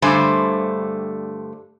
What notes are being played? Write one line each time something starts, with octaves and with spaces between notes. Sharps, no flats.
G2 D3 G3 A3 C5 G#5